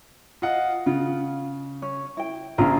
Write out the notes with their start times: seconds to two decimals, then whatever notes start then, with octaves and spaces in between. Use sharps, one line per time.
0.42 F4 D#5 F#5
0.86 C#3 F4
1.82 C#4
2.17 E4 G5
2.58 A#1 C#3 F4 G#4 A#5